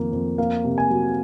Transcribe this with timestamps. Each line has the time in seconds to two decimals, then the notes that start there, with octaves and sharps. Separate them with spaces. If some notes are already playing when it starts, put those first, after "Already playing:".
Already playing: F2 D#3 A#3
0.12 F2
0.38 A#3 F5
0.64 C3
0.78 G#5
0.90 F#3